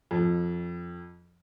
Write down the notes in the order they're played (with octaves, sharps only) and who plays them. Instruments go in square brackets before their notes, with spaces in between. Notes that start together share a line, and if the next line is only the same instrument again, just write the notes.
[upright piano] F2